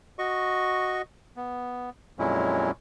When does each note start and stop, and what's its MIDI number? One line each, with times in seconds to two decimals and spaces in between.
0.19 1.02 66
0.19 1.02 75
0.19 1.02 85
1.37 1.90 59
2.19 2.71 41
2.19 2.71 46
2.19 2.71 54
2.19 2.71 56
2.19 2.71 61
2.19 2.71 64